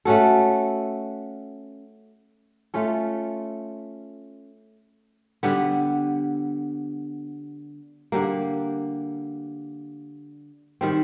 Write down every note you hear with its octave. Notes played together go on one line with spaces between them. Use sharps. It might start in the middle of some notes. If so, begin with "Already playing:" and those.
A3 C#4 F#4 A4
A3 C#4 F4 A4
D3 G3 B3
D3 G3 A#3
D#3 G3 C4